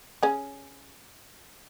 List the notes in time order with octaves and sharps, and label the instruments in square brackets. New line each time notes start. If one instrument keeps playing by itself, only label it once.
[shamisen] C#4 G#4